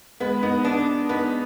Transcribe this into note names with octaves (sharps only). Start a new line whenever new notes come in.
G#3 B3 B4
B3 D#4
B3 D4 D#4
B3 D#4 B4